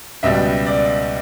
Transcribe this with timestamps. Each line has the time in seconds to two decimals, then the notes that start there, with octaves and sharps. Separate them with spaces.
0.23 C#2 B2 G3 E5
0.67 D5